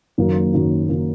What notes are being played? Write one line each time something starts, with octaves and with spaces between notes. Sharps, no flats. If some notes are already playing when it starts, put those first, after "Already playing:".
F#1 F#2 D#3 F#3 A#3
F#1 F#2 D#3 F#3 A#3
D#3 F#3 A#3